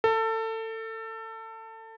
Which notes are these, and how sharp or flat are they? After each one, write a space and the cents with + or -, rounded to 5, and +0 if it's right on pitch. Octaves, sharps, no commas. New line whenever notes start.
A4 +25